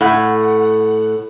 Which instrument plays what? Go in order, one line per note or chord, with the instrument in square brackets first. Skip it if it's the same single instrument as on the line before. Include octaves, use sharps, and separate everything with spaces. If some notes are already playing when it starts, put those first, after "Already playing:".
[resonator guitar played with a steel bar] A2 F#5